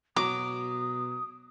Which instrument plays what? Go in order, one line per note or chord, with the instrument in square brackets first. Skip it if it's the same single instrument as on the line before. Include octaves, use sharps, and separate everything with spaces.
[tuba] B2 [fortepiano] F#3 [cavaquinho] D6 [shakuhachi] D#6